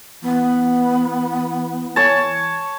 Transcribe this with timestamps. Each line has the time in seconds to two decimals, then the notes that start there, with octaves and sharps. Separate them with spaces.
0.23 E3 B3
1.96 C#5 A5